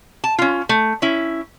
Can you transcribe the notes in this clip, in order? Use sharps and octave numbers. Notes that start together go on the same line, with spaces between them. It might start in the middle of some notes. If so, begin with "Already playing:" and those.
A5
C#4 F4
A3
C#4 E4